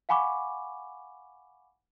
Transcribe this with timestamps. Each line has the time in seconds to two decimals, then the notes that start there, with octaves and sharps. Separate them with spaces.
0.09 F5 F#5 G#5 B5 C#6 D6